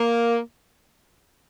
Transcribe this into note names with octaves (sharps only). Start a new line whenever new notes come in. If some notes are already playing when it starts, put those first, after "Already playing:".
Already playing: A#3